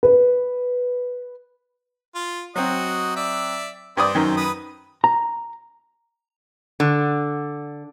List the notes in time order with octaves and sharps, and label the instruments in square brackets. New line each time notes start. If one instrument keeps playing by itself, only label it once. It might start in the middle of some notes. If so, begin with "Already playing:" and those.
[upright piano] B4
[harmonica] F4
[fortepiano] F#3 C4 [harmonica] F#4 D#5
[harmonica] D5 E5
[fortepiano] G2 D5 D#6 [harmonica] C4
[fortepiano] F#2 D#3
[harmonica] B4 D#6
[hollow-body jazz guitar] A#5
[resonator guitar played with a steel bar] D3